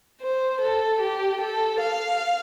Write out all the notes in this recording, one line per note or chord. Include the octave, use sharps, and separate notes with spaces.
C5
A4
G4
A4
F5